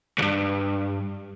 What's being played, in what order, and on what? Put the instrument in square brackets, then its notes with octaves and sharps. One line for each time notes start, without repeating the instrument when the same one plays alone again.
[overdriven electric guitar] C2 G2